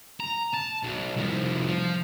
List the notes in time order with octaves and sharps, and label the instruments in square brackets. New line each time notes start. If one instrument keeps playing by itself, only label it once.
[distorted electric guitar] A#5
A5
B1
C2 F3
F3